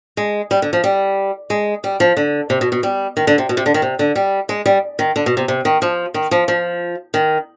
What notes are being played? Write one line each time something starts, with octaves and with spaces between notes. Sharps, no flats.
G#3
G3
D3
F3
G3
G#3
G3
F3
D3
C3
B2
B2
G3
D#3
D3
C3
B2
C3
D3
D#3
C3
D3
G3
G#3
G3
D#3
D3
B2
C3
C3
D#3
F3
D#3
F3
F3
D#3